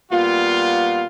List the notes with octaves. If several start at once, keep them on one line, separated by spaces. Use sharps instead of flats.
A#2 G3 B3 F4